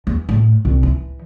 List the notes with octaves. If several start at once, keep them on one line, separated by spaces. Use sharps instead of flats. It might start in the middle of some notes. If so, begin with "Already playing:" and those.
E2
A2
C2
E3